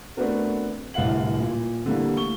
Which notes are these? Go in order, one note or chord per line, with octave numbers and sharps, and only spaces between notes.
A3 B3 C4 D4 F#4 A#4
D1 C2 A2 F5 F#5 F#7
A#2
D3 E3 G3 A#3
A3 C#6 G7